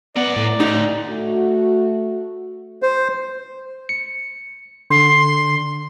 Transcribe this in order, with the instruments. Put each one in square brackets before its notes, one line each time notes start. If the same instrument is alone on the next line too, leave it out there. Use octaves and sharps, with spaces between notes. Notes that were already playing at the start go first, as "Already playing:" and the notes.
[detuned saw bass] B3 [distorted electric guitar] A#4 F#5 [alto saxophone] D5
[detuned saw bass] A2
[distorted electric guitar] D2 [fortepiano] D#4
[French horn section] A3 F#4
[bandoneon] C5
[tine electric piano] C#7
[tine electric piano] D3 [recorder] C6